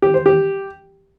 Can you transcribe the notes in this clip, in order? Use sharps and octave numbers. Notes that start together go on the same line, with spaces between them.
G4
C5
G4